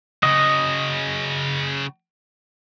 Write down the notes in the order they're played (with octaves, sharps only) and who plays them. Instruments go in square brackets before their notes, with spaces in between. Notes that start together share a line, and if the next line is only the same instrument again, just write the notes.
[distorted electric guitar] C#3 F#4 [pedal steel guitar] D#5